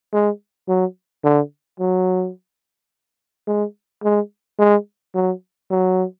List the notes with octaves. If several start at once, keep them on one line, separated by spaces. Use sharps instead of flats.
G#3
F#3
D3
F#3
G#3
G#3
G#3
F#3
F#3